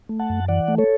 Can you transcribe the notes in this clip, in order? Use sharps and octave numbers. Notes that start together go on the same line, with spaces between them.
A3
F#5 A5
F#2
E3 D5 F#5
A3
A4 C#5